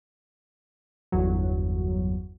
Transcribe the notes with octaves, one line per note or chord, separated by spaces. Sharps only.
G1 E2 F#3